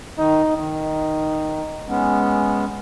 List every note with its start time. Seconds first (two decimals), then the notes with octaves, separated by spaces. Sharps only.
0.18 D#3 D#4
0.57 D#3 D#4
1.88 G#3 B3 C#4